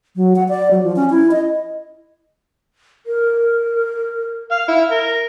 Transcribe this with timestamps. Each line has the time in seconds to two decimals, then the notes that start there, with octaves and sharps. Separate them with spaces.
0.16 F#3
0.36 F#5
0.49 D5
0.71 F#3
0.83 F3
0.96 C#4
1.10 E4
1.31 D#5
3.06 A#4
4.51 F5
4.68 E4
4.91 A#4